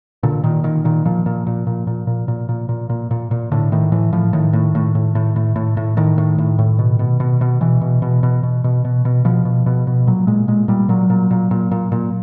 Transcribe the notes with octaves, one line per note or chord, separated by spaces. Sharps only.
A#2 D3
A#2 D#3
A#2 D#3
A#2 D#3
A#2 F3
A#2
A#2
A#2
A#2
A#2
A#2
A#2
A#2
A#2
A#2
A#2
A2 D3
A2 D#3
A2 E3
A2 F3
A2 D#3
A2
A2
A2
A2
A2
A2
A2
A2 D#3
A2
A2
A2
B2
B2
B2
B2
B2 E3
B2
B2
B2
B2
B2
B2
B2
B2 F3
B2
B2
B2
A#2 F#3
A#2 G#3
A#2 G#3
A#2 G3
A#2 F#3
A#2
A#2
A#2
A#2
A#2